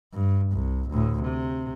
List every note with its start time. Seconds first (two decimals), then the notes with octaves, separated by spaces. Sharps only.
0.14 G2
0.52 C2
0.89 D2 A2
1.22 C3